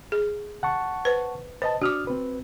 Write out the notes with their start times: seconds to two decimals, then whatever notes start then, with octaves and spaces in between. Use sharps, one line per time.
0.12 G#4
0.63 F#5 A5 C#6
1.05 B4 C5
1.62 B4 C5 D#5 A5
1.82 D4 F#4 D6 D#6 F6
2.07 C4 B4